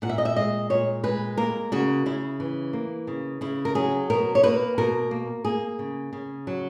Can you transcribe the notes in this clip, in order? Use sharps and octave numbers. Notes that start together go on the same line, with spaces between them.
A#2 F#5
E5
D#5
E5
G#3 D#5
A#2 C#5
G#3 B4
A#3 A#4
C#3 F#4
C#3 E4
E3
A#3
C#3
C#3 E4
A#4
F#3 G#4
B2 A#4
C#5
A#3 B4
B2 A#4
A#3
A#3 G#4
C#3
C#3
F#3